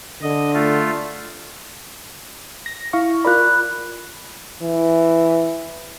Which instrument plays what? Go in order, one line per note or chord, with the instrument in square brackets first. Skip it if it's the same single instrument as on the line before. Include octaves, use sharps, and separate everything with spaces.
[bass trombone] D3 [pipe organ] D#5
[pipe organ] A3 F4
[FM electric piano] A#6
E4 F5 C#6
[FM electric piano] F4 A#4 D5 [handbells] B5 F#6
[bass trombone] E3